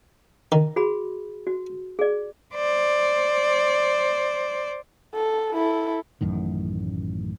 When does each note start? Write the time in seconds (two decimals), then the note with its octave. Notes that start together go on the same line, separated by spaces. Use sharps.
0.52 D#3
0.76 F#4 G#4 B5
1.47 F#4
1.99 G#4 D5
2.55 C5 D5
5.14 A4
5.54 E4 A4
6.21 A1 F#2 A2 D#3